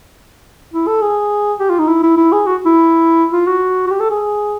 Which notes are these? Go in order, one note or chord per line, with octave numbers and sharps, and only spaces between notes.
E4
A4
G#4
G4
F4
D#4
E4
E4
E4
G#4
F#4
E4
F4
F#4
F#4
G4
A4
G#4